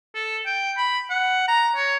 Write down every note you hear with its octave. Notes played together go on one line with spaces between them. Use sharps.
A4
G5
B5
F#5
A#5
C#5